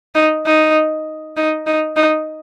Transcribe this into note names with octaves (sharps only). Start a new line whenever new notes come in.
D#4
D#4
D#4
D#4
D#4